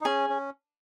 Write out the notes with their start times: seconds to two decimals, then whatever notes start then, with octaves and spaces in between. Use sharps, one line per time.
0.01 D#4
0.05 C#4 G#4
0.30 C#4